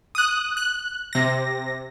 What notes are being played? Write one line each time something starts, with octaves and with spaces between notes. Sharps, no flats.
D#6 F#6
F#6
C3 A#6